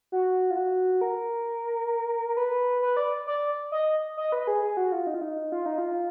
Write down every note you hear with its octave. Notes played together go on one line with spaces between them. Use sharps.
F#4
F4
F#4
A#4
B4
B4
D5
D5
D#5
D#5
B4
G#4
G#4
F#4
F4
D#4
F4
D#4
F4
D#4
F4